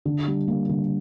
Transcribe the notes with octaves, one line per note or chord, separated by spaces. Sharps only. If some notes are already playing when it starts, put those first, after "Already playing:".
D3
G3
A#3
D3